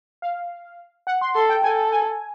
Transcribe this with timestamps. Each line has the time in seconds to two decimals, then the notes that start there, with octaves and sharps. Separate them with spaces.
0.22 F5
1.07 F#5
1.21 C6
1.35 A4 C6
1.49 G5
1.64 A4 G#5
1.92 G#5